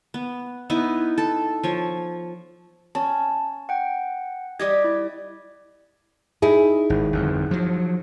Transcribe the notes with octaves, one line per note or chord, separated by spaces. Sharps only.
B3
B3 D#4 E4
A4
F3 C#5
C#4 A5
F#5 G5
G3 G4 D#5 G#6
E4
D#4 E4 G#4
G#1
G1 F2
F3 F#3